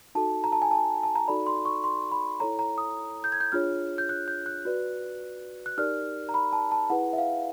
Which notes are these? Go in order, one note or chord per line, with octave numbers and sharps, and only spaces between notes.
D#4 F#4 A4 A5
A#5
A5
G#5
A5
A5
A#5
D#4 F#4 A4 D5 B5
C6
C#6
C6
B5
E4 A4 C#5 A#5
A#5
D#6
G6
G#6
G6
D4 F4 G#4 C#5 F6
G6
F#6
G6
F#6
F#4 B4 D5
F#6
D#4 G4 A#4 D5 F6
A#5
B5
A5
A5
E4 G#4 B4 F#5
E5
F5